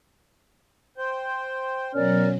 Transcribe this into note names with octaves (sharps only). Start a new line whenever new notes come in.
C5 G5
B2 F#3 C#4 A#4 D5 F6